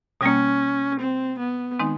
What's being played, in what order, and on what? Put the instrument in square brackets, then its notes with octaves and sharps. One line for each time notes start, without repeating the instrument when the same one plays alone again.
[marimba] B2 G3 A#3 [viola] C#4
[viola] C4
B3
[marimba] D#3 G#3 C4 D#4